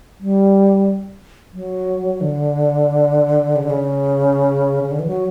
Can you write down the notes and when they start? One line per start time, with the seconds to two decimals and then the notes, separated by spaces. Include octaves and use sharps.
0.20 G3
1.53 F#3
2.21 D3
3.56 C#3
3.63 D3
3.70 C#3
4.84 C#3
4.91 D3
4.99 E3
5.07 F#3